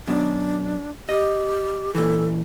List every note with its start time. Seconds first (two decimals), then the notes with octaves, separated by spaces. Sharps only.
0.07 F#2 B2 D4
1.09 G4 D#5
1.95 A#2 E3 A4